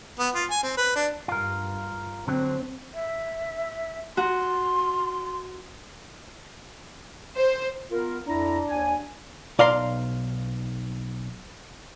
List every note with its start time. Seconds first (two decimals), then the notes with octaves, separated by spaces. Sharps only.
0.19 B3
0.35 F4
0.50 G#5
0.63 C4
0.77 B4
0.95 D4
1.28 G2 F4 A#4
2.28 D3 F#3 C4
2.94 E5
4.17 F#4 C6
7.36 C5
7.91 B3 F4 A#4
8.27 F2 D4 E4 A#5
8.68 D#2 G#5
9.59 B1 D5 F5 A#5 C6